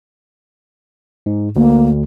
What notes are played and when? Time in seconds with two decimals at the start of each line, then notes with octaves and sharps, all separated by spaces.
1.26 G#2
1.56 D2 A#3